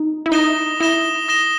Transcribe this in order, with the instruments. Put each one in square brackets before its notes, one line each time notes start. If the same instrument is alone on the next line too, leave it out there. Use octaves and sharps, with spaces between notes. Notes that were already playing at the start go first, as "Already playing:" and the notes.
Already playing: [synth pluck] D#4
E4
[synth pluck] D#4 [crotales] D#6 A#6 E7 G7
[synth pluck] E4 [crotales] D#6 A#6 E7 G7
[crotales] D#6 A#6 E7 G7